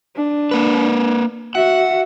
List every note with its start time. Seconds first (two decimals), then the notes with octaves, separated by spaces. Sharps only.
0.16 D4
0.51 A#3 B4
1.55 F#4 E5 F#5